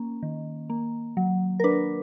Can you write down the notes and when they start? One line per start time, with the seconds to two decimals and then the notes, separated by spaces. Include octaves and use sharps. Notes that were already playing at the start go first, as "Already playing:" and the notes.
Already playing: A#3 C#4
0.23 D#3
0.70 A#3
1.17 F#3
1.60 A#4
1.64 D4 B4